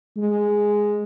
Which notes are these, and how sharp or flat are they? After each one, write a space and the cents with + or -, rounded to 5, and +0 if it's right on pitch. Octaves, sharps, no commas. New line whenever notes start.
G#3 +0